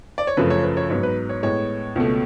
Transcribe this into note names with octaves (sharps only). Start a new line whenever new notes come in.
D5
C#5
F#2 C#3 F3 A3 B4
C#5
B4
C#5
G#2 F#3 B3 C#5
B4
C#5
A2 G#3 B3 C#5
C#2 B2 A3